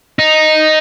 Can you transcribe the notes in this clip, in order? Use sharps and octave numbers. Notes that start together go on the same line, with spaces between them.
D#4